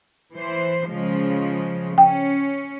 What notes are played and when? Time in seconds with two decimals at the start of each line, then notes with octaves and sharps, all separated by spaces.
0.34 E3 C5
0.89 C#3 F3 G#3
1.98 C#4 G5